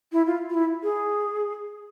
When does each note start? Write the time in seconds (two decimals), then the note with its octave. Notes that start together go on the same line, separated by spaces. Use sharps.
0.12 E4
0.27 F4
0.49 F4
0.54 E4
0.83 G#4